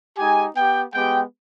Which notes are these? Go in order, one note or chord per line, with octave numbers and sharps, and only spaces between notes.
G#3 D#4 G4 G#5
B3 G4 G5
G#3 B3 G4 G5